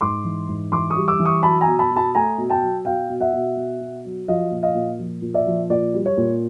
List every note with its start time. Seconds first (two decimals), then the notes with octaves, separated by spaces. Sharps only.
0.01 G#2 C6 D6
0.24 E3
0.49 G#2
0.72 E3 C6 D6
0.90 C#6 D#6
0.96 G3
1.08 D6 E6
1.19 E3
1.25 C#6 D#6
1.43 F#3 A5 B5
1.61 G#5 A#5
1.67 B2
1.79 A5 B5
1.91 B2
1.96 A5 B5
2.15 A3 G#5 A#5
2.38 B2
2.50 G5 A5
2.62 F#3
2.85 B2 F5 G5
3.10 B2
3.20 E5 F#5
3.33 B2
3.57 B2
3.81 B2
4.05 F#3
4.28 F3 D#5 F5
4.51 A#2
4.63 D#5 F5
4.75 A#2
4.99 F3
5.22 A#2
5.34 D5 E5
5.47 F3
5.70 A#2 D5
5.94 G3
6.06 C#5
6.17 A#2